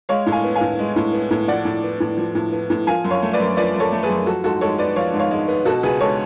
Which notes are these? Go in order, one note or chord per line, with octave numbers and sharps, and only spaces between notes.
G#3 C#5 F5
A2
F5 G#5
B3
F5 G#5
A2
G#3
A2
B3
A2
F3 D5 F#5
A2
B3
A2
F3
A2
B3
A2
F3 F5 G#5
F#2
C#5 F5
A3
B4 D5
F#2
F3 B4 D5
F#2
A4 C#5
A3
G#4 B4
F#2
F3 F#4 A4
G#2 F#4 A4
G#3 A4 C#5
B3 B4 D5
F3 C#5 F5
G#2
C#5 F5
G#3
B3
B2 F#4 A4
C#2 G#4 B4
G#3 A4 C#5